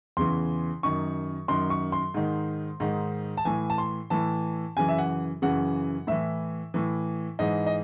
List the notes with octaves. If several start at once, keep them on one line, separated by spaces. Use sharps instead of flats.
E2 C#3 E3 C6
F#2 D#3 C#6
F#2 D#3 C6
C#6
C6
G#2 D#3
G#2 D#3
A5
A2 E3 G#5
A5
C6
A2 E3 A5
F#2 C#3 E3 G#5
E5
F#5
F#2 C#3 E3 F#5
A2 E3 E5
A2 E3
G#2 E3 D#5
D#5